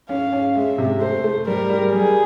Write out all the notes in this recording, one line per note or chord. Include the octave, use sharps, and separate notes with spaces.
C#4 F5
C#4
G#3 E5
C3
A3 C5
A3
G3 A#4
G3
G3 G#4